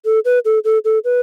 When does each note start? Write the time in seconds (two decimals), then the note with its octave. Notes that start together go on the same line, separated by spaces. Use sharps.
0.05 A4
0.25 B4
0.45 A4
0.65 A4
0.85 A4
1.04 B4